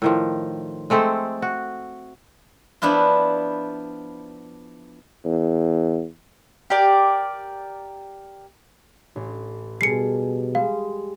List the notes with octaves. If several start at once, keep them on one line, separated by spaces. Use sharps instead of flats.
A2 D#3 F3
G#3 A3 C4 A4
F#4
F3 B3 D4 E4 F4
E2
G4 A#4 D5
A1
B2 G3 G#4 A4 C7 C#7
G3 G#3 F5